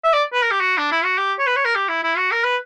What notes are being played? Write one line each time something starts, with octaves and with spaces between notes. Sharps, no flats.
E5
D5
B4
A#4
G4
F#4
D4
E4
F#4
G4
C#5
B4
C#5
A#4
G4
E4
E4
F#4
A#4
B4